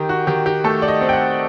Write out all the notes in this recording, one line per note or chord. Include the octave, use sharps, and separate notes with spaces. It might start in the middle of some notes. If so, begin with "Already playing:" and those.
Already playing: D#3 G4
F#4
D#3 G4
G4
A3 A4
D5
D#5
C4
G5
F#5